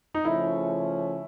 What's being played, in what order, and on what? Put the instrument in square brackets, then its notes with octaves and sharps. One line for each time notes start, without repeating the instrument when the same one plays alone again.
[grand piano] D#4
[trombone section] C#3 F3 A3 C#4 [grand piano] E4